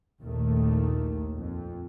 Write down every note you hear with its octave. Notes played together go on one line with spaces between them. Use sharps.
A#1 D#2 D#3 A3
F2